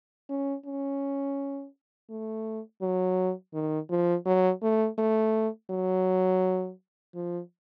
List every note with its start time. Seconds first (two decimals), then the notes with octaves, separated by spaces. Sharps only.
0.29 C#4
0.65 C#4
2.10 A3
2.82 F#3
3.54 D#3
3.90 F3
4.26 F#3
4.62 A3
4.98 A3
5.70 F#3
7.15 F3